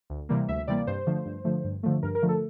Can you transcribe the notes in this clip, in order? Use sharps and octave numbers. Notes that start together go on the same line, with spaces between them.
D2
C3 E3 G3 A#3
D2 E5
C3 E3 G3 A#3 D5
G2 C5
D3 F3 A3
G2
D3 F3 A3
G2
D3 F3 A3
G2 A#4
A#4
D3 F3 A3
A4